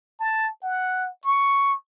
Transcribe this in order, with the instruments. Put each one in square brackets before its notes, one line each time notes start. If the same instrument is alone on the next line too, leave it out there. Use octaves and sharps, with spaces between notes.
[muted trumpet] A5
F#5
C#6